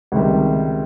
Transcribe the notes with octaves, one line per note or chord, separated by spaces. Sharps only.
C#2 C3 D#3 G3